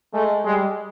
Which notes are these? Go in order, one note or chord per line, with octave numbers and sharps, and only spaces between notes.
G#3 A3
G3 G#3